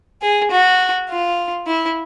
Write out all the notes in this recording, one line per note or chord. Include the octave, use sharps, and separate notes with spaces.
G#4
F#4
F4
E4